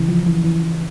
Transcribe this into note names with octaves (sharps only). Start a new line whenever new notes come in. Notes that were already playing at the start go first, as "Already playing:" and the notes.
Already playing: C#3 E3
F3
E3
E3